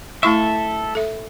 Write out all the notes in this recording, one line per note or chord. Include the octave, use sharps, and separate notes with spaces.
A3 E4 A4 E5 C#6
A4 E5